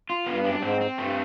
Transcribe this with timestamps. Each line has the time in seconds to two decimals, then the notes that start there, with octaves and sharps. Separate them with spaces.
0.10 F4
0.26 G2 B3
0.44 F#2 D4
0.54 G2
0.62 G#2 C4
0.81 C4
0.98 G2 A3